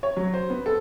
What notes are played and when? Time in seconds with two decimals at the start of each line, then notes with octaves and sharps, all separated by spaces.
0.03 C#5
0.17 F#3
0.34 C5
0.50 B3
0.66 A4